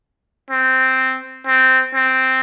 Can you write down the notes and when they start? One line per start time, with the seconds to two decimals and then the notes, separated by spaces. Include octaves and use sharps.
0.51 C4
1.47 C4
1.95 C4